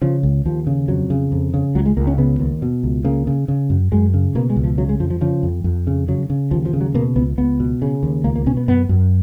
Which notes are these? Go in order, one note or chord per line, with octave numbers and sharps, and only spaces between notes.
C#3 F3
C#2
D#2 F3
C#3
F2 F#3
C#3
F2
C#3
C#2 F#3
G#3
C#2 A#3
C#4
C#3 B3
D#2
B2
C#2
C#3 A#3
C#3
C#3
F#2
F#2 G#3
C#3
B2 A#3
G#3
C#2
F3
C#3 F#3
G#3
F2 F3
F3
C#3 F3
F2
F2
C#3
C#3 F#3
C#3
D#2 F3
F3
C#3
F#3
B2 A#3
C#2 B3
C#2 B3
B2
C#3
D#2
C#2 A#3
A#3
B2 C#4
B3
F#2 B3
F#2